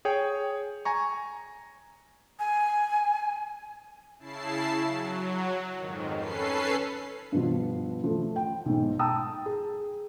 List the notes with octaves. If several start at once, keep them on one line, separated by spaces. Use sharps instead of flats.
G#4 C#5 G5
G#5 A#5 C#6
G#5
C#3 E4 A5 C7
F#3
F2 G#2 D#3
C#4 A4 B4 C7
G2 B2 F3
F3 A3
G5
B1 G#2
G5 A5 A#5 D#6 E6
G#4